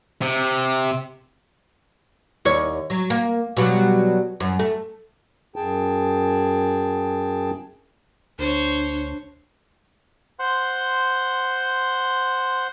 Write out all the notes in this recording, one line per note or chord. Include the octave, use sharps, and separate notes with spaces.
C3
D#2 C#5
F#3
A#3
B2 F#3 G3
F#2
A3
F#2 G#4 G5 A5
D2 D4 C5 C#5
C5 F#5 C6